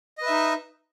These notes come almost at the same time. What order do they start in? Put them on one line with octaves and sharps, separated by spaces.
D#5 B4 E5 D#4